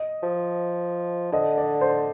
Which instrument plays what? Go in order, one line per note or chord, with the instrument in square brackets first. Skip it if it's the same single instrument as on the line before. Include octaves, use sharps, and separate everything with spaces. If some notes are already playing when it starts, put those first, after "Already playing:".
Already playing: [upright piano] D#5
[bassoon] F3
[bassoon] D3 [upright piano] D#5
[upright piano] D5
C5